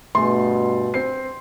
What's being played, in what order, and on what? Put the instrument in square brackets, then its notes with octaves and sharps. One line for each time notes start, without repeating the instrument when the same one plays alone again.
[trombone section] G2 B2 [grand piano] A3 G#4 [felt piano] C6
[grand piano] C4 C7